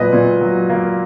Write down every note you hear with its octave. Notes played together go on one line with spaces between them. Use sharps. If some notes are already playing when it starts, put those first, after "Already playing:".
Already playing: A#2 F#3 A#3 B4 D#5
A#2
F#3
A#3